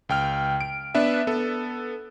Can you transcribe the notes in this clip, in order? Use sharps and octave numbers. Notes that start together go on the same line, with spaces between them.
C#2 G5 F6
D7
B3 D4 B4 E5
B3 A4